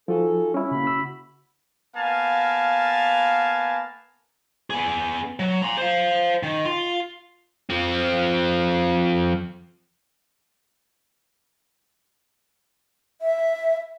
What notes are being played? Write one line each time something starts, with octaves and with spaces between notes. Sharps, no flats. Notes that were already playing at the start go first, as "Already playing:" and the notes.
F3 D#4 F4 F#4 G#4 A4
G3 C#4 E4
C#3 A#3 F#4 B5
C#3 E6
A#3 B3 F5 G#5 A5
B3 G#4
F#3
A#5 C6
C5 F5
D#3
F4
F3 C4
E5